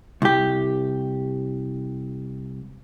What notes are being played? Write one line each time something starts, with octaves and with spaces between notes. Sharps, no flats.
C2 G4